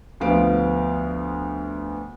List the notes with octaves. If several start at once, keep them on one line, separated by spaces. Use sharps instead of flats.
D2 F3 B3 F5 D7